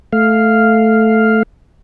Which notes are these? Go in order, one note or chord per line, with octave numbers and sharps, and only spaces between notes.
A3 F5